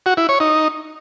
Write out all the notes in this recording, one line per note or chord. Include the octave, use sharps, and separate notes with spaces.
F#4
E4
C#5
D#4